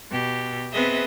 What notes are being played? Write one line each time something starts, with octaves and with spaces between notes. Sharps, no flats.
B2 G4
B3 C4 G#4 B4 D#5 E5